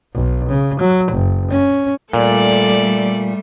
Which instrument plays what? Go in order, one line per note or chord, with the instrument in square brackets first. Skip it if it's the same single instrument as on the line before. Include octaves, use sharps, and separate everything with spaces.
[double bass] B1
C#3
F#3
F#1
C#4
[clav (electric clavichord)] A#2 [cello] G3 A3 [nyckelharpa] A4 D5